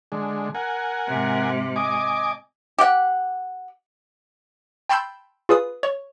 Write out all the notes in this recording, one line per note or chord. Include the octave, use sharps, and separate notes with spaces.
D3 G#3
A#4 F#5 G#5
G#2 C3
D#5 G#5 D6
G4 F#5
G5 A5 B5 C6 E6 G6
F4 G#4 B4 D#6
C#5